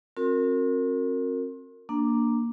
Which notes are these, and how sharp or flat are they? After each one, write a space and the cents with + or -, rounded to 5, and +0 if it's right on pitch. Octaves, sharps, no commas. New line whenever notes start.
C4 +35 F#4 -40 A#4 -25
A#3 +0 D4 +0